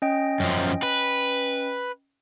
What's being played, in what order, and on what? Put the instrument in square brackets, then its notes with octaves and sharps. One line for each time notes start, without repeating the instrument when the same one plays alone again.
[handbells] C#4 D#5 G5
[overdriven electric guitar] F#2 F3
B4